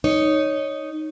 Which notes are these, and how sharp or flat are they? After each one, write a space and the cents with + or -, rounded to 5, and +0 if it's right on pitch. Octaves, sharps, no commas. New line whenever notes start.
D#4 -5 C#5 +0